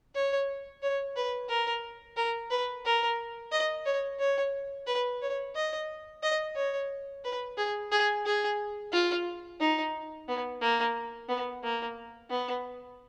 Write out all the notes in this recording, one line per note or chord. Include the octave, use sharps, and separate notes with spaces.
C#5
C#5
B4
A#4
A#4
B4
A#4
D#5
C#5
C#5
B4
C#5
D#5
D#5
C#5
B4
G#4
G#4
G#4
F4
D#4
B3
A#3
B3
A#3
B3